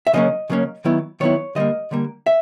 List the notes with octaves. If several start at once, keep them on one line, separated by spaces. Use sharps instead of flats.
E5
C#3 F#3 A#3 C#4 D#5
C#3 F#3 A#3 C#4
D#3 F#3 B3 E4
D#3 F#3 B3 E4 C#5
D3 G3 A#3 D#5
D3 G3 A#3
E5